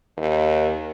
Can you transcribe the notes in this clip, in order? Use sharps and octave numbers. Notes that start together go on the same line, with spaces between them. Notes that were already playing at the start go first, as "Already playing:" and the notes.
D#2